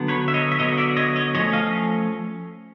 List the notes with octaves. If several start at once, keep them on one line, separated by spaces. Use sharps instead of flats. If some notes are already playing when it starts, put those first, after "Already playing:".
Already playing: D3 F#3 B3
B4 C#5
E5
C#5 D#5
E5
D3 F#3 B3 C#5 D#5
D5 E5
C#5 D#5
C#5 D#5
F3 A3 C#4 C#5 D#5
D#5 F5